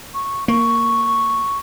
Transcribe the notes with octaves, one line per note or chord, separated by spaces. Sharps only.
C#6
A#3 C#6